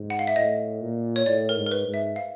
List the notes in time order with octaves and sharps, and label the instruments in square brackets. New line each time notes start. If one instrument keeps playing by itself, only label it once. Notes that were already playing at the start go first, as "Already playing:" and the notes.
Already playing: [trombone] G#2
[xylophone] F#5
F5
E5
[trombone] A2 [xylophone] D#5
[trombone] A#2
[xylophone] C#5
[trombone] A2 [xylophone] D5
[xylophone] A#4
[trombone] G#2
[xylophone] A#4
B4
[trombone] G#2
[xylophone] E5
F5